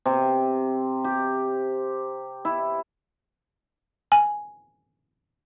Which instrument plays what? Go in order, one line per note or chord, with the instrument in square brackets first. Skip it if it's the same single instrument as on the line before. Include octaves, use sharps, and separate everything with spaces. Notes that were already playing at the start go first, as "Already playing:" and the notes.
[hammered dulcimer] C3
G4
E4
[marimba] G#5